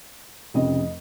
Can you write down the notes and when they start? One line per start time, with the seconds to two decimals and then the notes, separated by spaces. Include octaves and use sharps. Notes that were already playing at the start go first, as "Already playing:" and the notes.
0.54 F1 F2 C#3 D#5